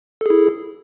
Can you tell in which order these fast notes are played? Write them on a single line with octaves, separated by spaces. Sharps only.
A4 G#4 E4